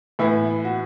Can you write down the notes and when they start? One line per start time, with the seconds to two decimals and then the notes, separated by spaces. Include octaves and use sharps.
0.19 A2 E3 B3 E4
0.65 F#4